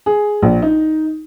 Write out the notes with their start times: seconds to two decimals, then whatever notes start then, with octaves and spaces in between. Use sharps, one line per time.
0.06 G#4
0.42 A#1
0.62 D#4